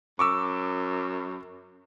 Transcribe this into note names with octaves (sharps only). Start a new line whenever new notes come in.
F#2 C#6 D6 E6